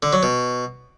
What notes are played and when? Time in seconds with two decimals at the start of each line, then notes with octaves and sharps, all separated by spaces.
0.03 D3
0.13 F#3
0.23 B2